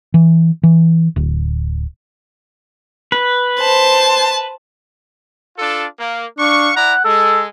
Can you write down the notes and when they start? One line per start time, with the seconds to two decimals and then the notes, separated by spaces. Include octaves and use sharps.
0.14 E3
0.63 E3
1.16 D1
3.12 B4
3.60 C5 A5
5.58 D4 F4 A4
5.98 A#3
6.39 D4 F5 C#6
6.75 E4 D5 F#5 A#5
7.05 G#3 A4